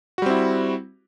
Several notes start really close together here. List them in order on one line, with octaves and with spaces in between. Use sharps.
F#4 G3 C4 E4